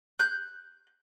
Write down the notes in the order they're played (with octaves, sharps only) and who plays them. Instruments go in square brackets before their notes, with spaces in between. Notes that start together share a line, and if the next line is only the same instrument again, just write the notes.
[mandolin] F#6 G6